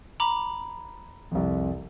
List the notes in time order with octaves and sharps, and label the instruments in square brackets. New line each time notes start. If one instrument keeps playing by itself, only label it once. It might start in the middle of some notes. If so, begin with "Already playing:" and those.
[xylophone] A#5 B5 D6
[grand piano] C2 F2